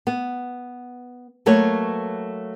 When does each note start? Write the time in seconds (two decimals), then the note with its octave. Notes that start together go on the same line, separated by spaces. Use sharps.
0.07 B3
1.46 F#3 A3 A#3 B4 C#5